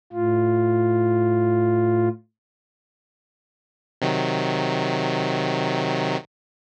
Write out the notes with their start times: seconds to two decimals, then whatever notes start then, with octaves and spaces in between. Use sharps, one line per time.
0.13 A2 F4
4.02 C3 D#3 F#3